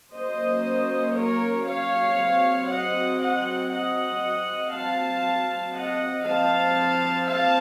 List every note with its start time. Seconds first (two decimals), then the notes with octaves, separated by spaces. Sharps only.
0.13 F#3 A#3 C#4 C5 D#5
1.16 A#4 C#5
1.66 C#5 F5
2.17 F#3 C4
2.69 D#5 F#5
3.20 D#5 F#5
3.70 D#5 F#5
4.21 F#3 C4
4.73 F5 A5
5.74 D#5 F#5
6.26 F3 C4 F5 A5
7.29 F5 A5